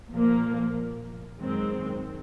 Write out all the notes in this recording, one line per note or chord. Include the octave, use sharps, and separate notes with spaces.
A#2 F3 A#3
F#2 D#3 G#3 C4